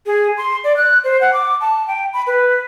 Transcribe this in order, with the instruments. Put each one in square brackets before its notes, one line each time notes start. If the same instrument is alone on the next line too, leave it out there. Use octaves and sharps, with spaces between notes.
[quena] G#4
C6
D5
F#6
C5
F#5
D6
A5
G5
B5
B4